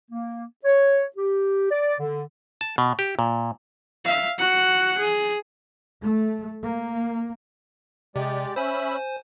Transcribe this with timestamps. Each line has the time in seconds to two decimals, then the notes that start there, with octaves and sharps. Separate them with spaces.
0.11 A#3
0.65 C#5
1.17 G4
1.70 D5
2.00 D3
2.61 A5
2.78 B2
2.99 G4
3.19 A#2
4.05 E5 F5
4.38 F#4 F#5
4.98 G#4
6.03 A3
6.63 A#3
8.16 C3 G#3 G4 D5
8.56 C#4 C5 E5 G#5 B5